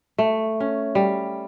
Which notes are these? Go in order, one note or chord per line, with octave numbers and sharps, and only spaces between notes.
A3
C#4
G3